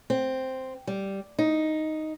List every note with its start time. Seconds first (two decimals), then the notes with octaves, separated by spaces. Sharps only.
0.10 C4
0.87 G3
1.39 D#4